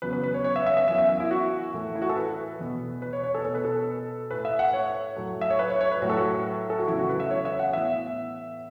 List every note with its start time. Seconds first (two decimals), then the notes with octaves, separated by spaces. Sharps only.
0.02 E2 C#3 F#3 B3 B4
0.13 B4
0.23 B4
0.34 C#5
0.44 C#5
0.56 E5
0.66 E5
0.77 E5
0.88 F#2 E3 B3 E5
0.98 E5
1.09 E5
1.20 E4
1.31 F#4
1.74 A2 E3 A3
1.95 E4
2.02 F#4
2.09 A4
2.16 B4
2.59 E2 B2 B3
3.02 B4
3.13 C#5
3.24 C#5
3.34 A4
3.45 B2 B3 A4
3.55 B4
3.65 A4
4.31 A2 A3 B4
4.45 E5
4.59 F#5
4.73 C#5
5.16 A2 F#3 A3
5.41 E5
5.50 C#5
5.59 B4
5.70 C#5
5.81 C#5
5.91 B4
6.02 A2 F#3 A3 F#4
6.10 A4
6.17 F#4
6.70 A4
6.78 F#4
6.88 E2 C#3 F#3 A3 E4
6.99 F#4
7.09 B4
7.20 E5
7.31 C#5
7.45 E5
7.59 F#5
7.73 A2 E3 B3 E5